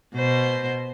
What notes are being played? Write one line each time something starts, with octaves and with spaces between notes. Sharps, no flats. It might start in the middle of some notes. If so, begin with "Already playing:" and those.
B2 C5